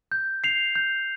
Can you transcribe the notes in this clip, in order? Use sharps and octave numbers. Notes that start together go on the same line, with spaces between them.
G6
C7 F7
G6